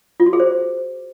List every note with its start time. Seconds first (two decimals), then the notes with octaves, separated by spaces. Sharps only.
0.20 F4
0.26 F#4
0.33 G#4
0.40 C5